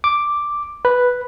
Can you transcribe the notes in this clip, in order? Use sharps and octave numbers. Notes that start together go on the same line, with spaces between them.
D6
B4